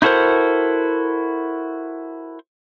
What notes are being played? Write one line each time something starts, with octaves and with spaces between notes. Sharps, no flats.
D#4 E4 F#4 A4 A#4 C5